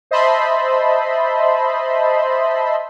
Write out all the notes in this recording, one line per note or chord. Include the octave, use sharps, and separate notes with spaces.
C5 D#5 E5 A5 B5 C6